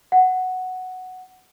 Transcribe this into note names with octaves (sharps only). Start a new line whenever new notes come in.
F#5